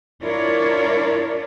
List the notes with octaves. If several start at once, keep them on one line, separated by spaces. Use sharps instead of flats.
D4 E4 F4 A#4 C#5 D5